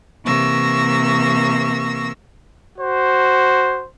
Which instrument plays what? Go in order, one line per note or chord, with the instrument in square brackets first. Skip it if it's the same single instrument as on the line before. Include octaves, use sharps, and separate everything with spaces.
[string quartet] C3 E3 A#3 C#6 E6 A#6
[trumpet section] F#4 C5